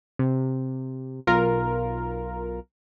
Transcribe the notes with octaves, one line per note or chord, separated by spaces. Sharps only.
C3
B1 F4 A#4